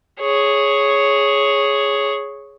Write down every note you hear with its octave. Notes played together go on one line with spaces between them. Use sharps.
G#4 C#5